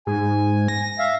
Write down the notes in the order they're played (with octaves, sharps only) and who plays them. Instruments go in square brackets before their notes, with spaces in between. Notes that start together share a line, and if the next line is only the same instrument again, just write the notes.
[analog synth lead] G#2 [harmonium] G#5
[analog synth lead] A#6
[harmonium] E5 F5